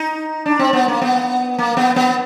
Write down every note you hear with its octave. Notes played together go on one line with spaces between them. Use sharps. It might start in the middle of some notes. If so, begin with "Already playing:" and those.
Already playing: D#4
D4
C4
B3
A#3
B3
A#3
B3
B3